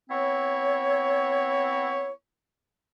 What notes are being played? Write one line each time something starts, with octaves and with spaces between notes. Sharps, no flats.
B3 C4 E4 C#5